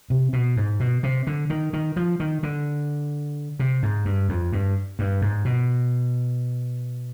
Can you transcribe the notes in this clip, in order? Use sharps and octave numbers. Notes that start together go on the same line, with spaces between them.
C3
B2
G#2
B2
C3
D3
D#3
D#3
F3
D#3
D3
C3
G#2
G2
F2
G2
G2
G#2
B2